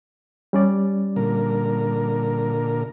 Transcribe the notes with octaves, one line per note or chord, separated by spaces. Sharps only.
G3 C#4 D5
A#2 D3 A#4